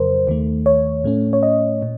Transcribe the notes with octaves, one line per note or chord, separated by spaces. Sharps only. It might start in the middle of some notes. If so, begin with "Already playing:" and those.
Already playing: F2 C#3 F#3 A#4 C5
D#2 D#3 A3
C#5
A2 A3 C#4
C#5
D#5
A#2